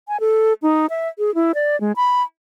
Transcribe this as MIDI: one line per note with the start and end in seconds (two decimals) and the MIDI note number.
0.08 0.20 80
0.20 0.53 69
0.62 0.86 63
0.90 1.08 76
1.19 1.34 68
1.35 1.52 64
1.55 1.79 74
1.81 1.92 56
1.96 2.23 83